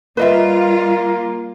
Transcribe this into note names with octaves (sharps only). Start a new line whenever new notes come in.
G3 A#3 F4 B4 D#5 E5